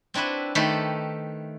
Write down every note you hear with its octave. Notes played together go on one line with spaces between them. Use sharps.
C4 D4 E4 F#4 B4
D#3 A3 G4 A4 B4 C5